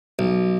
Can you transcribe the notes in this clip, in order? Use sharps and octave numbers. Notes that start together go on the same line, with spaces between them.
B1